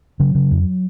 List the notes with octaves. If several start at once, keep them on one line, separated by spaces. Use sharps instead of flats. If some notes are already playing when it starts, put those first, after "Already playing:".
C#3 F#3
C#3
F2